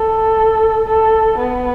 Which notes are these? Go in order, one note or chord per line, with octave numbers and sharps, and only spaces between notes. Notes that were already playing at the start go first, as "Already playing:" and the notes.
Already playing: A4
A4
B3